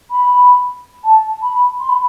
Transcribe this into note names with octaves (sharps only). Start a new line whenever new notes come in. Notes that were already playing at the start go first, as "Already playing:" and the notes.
B5
A5
B5
C6
B5